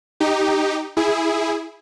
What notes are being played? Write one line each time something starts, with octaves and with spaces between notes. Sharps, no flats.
D#4 G4
E4 G#4